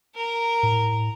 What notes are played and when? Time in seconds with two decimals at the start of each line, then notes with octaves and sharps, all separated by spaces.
0.15 A#4 A#5
0.63 A2